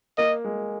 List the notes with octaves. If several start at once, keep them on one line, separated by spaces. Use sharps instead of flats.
A#3 D#5
G#3